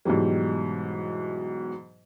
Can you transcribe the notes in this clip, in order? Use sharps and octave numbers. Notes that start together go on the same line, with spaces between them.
G#2 B2 E3 F#3 G3